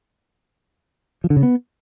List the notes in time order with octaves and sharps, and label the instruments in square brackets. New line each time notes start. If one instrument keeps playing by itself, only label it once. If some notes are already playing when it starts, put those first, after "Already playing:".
[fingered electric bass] F3
D3
C#3
B3